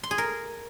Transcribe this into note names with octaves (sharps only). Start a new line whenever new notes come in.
C6
G#4
A#4